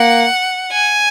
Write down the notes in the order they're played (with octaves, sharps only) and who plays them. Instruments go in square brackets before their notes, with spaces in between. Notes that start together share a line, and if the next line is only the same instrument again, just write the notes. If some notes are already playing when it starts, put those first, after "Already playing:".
Already playing: [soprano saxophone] A#3 [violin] F#5
[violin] G#5